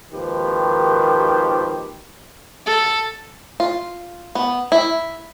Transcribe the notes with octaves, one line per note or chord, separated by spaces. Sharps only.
G#1 D#2 D#3 F3 G4 B4
A4
F4
B3
E4